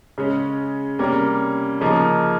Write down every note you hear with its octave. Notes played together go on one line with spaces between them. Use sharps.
C#3 G#3 C#4
C3 G3 A#3 C#4
C#3 F3 A#3 D#4